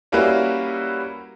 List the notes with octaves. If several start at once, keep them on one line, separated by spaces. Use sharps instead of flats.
G3 A#3 C#4 E4 F#4 B4